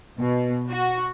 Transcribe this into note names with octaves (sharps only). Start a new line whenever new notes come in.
B2
F#4